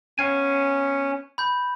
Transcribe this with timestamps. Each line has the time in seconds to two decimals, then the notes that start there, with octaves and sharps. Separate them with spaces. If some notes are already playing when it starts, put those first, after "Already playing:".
0.19 B3 C#4 F5 G#5
1.38 B5 G6